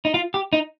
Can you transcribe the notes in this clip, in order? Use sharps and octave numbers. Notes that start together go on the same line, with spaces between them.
D#4
F4
G4
D#4